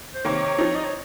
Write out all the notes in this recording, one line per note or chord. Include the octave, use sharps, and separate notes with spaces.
C5
C3 D#3 A#3 C#5
F3 C4 D#4
D#5
C#5